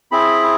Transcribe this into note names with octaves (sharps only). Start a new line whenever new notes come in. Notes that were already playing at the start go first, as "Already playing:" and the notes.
C4 E4 G#4 B5